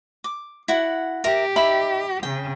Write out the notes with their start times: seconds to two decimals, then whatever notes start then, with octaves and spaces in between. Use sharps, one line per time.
0.24 D6
0.68 E4 F#4 F#5
1.24 G4 A#4 E5
1.56 D#4 E5 B5
2.23 C#3 G5